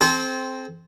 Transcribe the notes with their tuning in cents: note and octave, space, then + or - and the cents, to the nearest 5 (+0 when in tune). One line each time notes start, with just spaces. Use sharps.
C4 +0 A4 -40